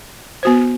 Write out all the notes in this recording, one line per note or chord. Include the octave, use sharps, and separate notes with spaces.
B3 F#4 C5